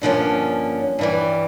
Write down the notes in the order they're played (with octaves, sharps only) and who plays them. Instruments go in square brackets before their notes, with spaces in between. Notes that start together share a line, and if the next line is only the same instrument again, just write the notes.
[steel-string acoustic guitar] G2 D3 F3 A#3 C#4
G2 E3 G3